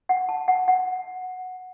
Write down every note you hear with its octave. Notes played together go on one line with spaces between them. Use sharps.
F#5
A5
F#5
F#5